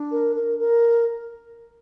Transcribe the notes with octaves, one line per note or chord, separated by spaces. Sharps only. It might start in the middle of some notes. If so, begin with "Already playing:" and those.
Already playing: D4
A#4
A#4
A#4